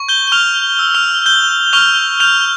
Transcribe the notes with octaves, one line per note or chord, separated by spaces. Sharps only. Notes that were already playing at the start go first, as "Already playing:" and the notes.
Already playing: C#6
G6 G7
G7
C#6 F6 F7
E6
F6 F7
G6 G7
C#6 F6 F7
F6 G6 F7